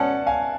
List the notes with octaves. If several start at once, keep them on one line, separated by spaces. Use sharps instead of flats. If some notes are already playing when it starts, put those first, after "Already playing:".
Already playing: B2 G#3 C#4 D5 F#5 A5
F5 G#5